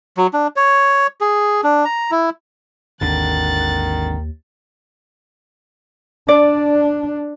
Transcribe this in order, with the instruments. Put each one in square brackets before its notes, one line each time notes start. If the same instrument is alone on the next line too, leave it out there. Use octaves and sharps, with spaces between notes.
[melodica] F#3
D4
C#5
G#4
D4
A#5
E4
[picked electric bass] G#1 D3 [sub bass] D#2 [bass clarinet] D#3 [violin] F#6 A6
[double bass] D4 [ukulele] D5